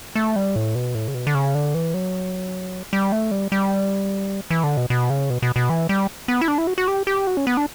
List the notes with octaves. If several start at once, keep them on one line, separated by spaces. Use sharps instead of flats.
A3
G3
A2
B2
A2
C#3
B2
D3
C#3
D3
E3
F#3
G3
A3
G3
G3
E3
D3
B2
B2
C#3
B2
B2
B2
E3
G3
B3
E4
D4
E4
F#4
F#4
G4
G4
F#4
C#4
B3
D4